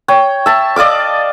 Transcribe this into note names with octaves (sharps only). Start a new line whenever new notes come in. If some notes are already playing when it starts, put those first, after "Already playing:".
C#5 G5
E5 A5
D5 D#5 F5 D6